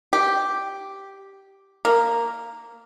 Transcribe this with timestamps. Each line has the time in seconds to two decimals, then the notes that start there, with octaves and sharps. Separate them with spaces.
0.13 G4
1.85 A#3